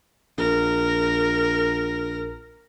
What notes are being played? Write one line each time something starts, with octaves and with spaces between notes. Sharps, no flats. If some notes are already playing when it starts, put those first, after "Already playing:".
A#1 A#4